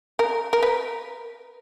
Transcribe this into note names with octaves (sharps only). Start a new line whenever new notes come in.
A#4
A#4
B4